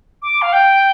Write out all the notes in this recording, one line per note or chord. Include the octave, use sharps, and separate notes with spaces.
D6
F5
G5